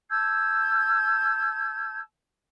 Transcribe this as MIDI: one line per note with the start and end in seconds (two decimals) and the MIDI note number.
0.10 1.99 81
0.10 1.99 88
0.10 1.99 91
0.10 1.99 92